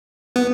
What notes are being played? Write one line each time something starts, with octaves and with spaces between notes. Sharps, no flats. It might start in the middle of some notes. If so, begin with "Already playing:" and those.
B3